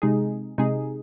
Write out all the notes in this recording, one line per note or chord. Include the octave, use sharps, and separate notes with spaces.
C3 G#3 D#4 G#4
C3 G#3 D#4 G#4